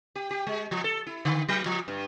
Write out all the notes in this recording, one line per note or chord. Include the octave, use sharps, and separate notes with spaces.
G4
G4
G#3
F3
A4
E4
D3
F#3
F3
G2